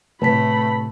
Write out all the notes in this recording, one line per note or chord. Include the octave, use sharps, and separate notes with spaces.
A2 C3 A3 B4 A5 B5 B6